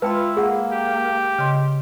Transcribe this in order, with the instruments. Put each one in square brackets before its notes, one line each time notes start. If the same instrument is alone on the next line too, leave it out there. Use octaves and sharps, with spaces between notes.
[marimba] G#3 A5 [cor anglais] E4 [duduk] F4 [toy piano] B4 G5 B5
[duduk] A#3 [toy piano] G#4 F#5
[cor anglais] G4
[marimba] C#3 D#5 C6